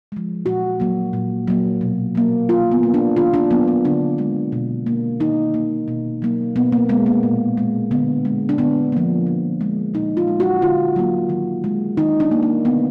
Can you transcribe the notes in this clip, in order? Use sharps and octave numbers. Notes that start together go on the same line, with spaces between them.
F3 G#3
A#2 F#4
F#3 A#3
A#2
F#3 A#3
B2
F#3 A#3
D#3 F4
B3
A#3
D4
D#3 F4
D4
F#3 A#3 B3
B3
D3 D4
G#3
B2
A#3
D#3 D#4
A#3
B2
F#3 A#3
B2 B3
A#3
G#3 B3
A#3
A#2
G#3
D3 B3
G#3
D4
D3 B3
F3 A#3
D3
G#3
A#2 D#4
F4
G#3
F#4
D3 F4
F#3 A#3
D#3
G#3
D#3 D#4
D4
A#3
A#3
D3 B3